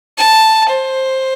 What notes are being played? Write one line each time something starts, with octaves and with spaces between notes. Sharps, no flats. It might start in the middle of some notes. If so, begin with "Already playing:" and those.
A5
C5